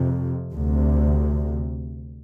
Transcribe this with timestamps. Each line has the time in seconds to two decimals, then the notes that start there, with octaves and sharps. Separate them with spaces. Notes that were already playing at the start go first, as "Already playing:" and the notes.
Already playing: F2 C3
0.54 D2 C3